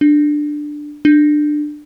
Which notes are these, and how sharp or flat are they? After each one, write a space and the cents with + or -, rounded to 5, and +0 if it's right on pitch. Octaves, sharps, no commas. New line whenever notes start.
D4 +10
D4 +20